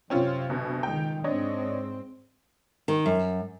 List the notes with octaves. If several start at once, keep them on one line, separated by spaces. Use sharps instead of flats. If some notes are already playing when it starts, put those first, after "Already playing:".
F#2 C3 C4 C#4 F4
D2 B2
C#2 D#3 G5
G#2 C4 D4 C#5 D#5
D#3
F#2